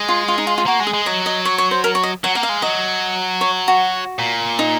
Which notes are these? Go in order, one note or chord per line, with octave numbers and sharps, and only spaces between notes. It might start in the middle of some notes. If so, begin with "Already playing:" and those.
Already playing: G#3
F4
F4
D#4
F4
F4
A#3 F#4
G#3
G#4
G#3
F#3 D#5
D#5
C#5
C#5
C5
A#4
C#5
D#5
F#3 F#5
A#3 F#5
F5
G#3
F#3 D#5
C#5
F#4
A#2
D#4